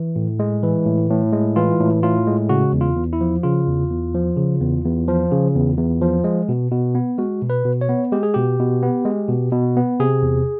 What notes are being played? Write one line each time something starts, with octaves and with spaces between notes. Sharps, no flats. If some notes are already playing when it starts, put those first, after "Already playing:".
Already playing: E3
A2
G#3
E3
A2
A2
G#3
E3 F4
A2
A2 F4
G#3
C#3 F#4
E2
F4
E2
E4
F3
C#3 F4
E2
E2
F3
C#3
E2
E2
F3
C#3
E2
E2
F3
G#3
B2
B2
B3
G#3 F#4
B2
B4
B2
C#5
B3
G#3 G4
G#4
B2 G4
B2
B3
G#3
B2
B2
B3
C3 G#4
E2